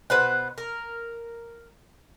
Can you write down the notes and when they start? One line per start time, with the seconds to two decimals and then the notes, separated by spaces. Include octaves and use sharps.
0.10 B2 B4 C5 F#5
0.58 A#4